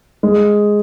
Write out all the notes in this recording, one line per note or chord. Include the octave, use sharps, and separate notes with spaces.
G#3